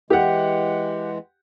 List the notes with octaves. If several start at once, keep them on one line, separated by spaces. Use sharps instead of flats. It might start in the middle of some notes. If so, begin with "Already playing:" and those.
E3 G#3 G4 F#5